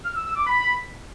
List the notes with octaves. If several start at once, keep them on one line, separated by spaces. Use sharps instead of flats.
F6
E6
E6
D6
B5